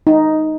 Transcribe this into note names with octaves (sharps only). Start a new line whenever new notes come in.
D#4